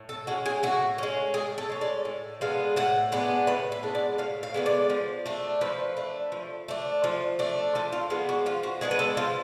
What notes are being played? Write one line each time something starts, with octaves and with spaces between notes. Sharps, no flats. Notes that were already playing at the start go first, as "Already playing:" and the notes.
Already playing: A2
A4
G#3 C#4 F#4
G#4
A2 F#4
G#3 C#4
A2 G#4
A4
G#3 C#4
D5
A2
G#3 B3 D4 F5
A2 F#5
G#3 B3 D4
A2 B4
B4
G#3 B3 D4
D5
A2 F5
F5
G#3 B3 D4
D5
F3
A3 D4
F3 B4
A3 D4
F3
A3 D4
F3
A3 D4
F3 A4
F4
G#3 B3 D4 F4
F#4
F3 F4
F#4
G#3 B3 D4 G#4
B4
A4
F3 F4